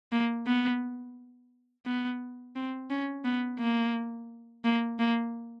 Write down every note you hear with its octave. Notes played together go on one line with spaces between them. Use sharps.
A#3
B3
B3
C4
C#4
B3
A#3
A#3
A#3